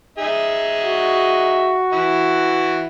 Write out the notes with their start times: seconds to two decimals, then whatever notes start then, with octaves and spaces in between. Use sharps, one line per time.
0.18 D#4 G#4 E5
0.83 F#4
1.92 E3 E4